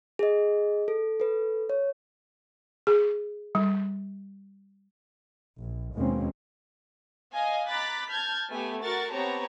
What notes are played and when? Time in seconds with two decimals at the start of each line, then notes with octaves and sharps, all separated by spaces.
0.19 G#4 D#5
0.88 A4
1.20 A4 B4
1.70 C#5
2.87 G#4
3.55 G3
5.59 A#1
5.95 D#2 B2 G#3 A#3 C4 C#4
7.33 D#5 F5 G#5
7.68 A#5 B5 D6 F#6 A6 B6
8.09 A5 F6 G6 G#6
8.50 A3 B3 G4 G#5
8.81 F#4 A#4 C#6 A6
9.12 B3 C4 G4 C#5 A5 A#5